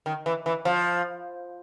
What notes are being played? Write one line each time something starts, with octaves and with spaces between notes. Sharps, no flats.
D#3
E3
E3
F3